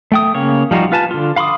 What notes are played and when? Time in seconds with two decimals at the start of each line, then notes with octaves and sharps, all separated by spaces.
0.12 A3 G5 D#6
0.35 C#3 A#3 C#5
0.71 F3 G3 D#4 F4 F#4
0.92 F4 B4 G#5 A5
1.11 D3 F4
1.36 F5 B5 C6 D6 D#6